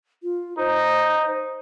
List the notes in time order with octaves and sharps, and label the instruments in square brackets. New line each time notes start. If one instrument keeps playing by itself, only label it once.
[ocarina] F4
[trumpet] D#4 [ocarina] C5